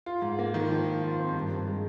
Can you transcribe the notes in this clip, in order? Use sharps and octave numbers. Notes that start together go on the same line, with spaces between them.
F4
G#2
A#3
D#3
F3
F3
F4
C4
G2
G2
G#3